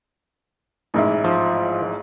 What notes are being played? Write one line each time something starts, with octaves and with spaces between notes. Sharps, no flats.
A1 G#2 E4
F3